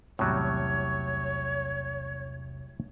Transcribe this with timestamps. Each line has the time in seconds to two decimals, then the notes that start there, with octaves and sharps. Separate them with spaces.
0.19 B1 E2 A2 C3 F#3 G3 C#5